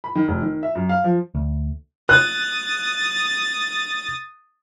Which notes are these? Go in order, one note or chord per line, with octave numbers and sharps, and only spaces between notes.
B5
D#3
F1
D#3
E5
F#2
F5
F3
D2
D#6 F#6 A6